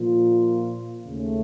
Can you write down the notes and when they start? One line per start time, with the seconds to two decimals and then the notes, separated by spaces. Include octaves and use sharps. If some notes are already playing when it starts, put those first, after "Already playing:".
Already playing: A#2 F3 A#3 F4
1.06 D#2 C#3 A3 C#4